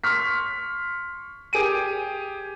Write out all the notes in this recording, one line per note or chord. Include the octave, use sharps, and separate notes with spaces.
C6 C#6 F6 B6
G4 G#4 D7 D#7